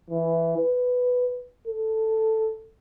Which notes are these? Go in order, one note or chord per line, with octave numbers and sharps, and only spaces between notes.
E3
B4
A4